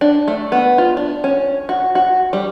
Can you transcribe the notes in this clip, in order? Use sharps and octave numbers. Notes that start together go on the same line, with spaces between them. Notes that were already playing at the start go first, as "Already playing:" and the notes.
D4
A3
B3
F4
D4
C#4
F#4
F#4
G3